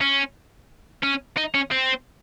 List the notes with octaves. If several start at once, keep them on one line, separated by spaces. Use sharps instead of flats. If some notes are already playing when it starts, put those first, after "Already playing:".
C#4
C#4
D#4
C#4
C4